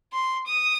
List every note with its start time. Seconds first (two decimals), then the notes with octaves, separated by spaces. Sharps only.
0.13 C6
0.47 D#6